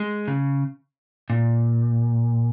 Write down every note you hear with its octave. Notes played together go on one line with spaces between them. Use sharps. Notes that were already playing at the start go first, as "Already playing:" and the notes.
Already playing: G#3
C#3
A#2